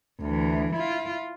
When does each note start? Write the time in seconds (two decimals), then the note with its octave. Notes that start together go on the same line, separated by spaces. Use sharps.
0.21 D2 E3
0.75 E4 F4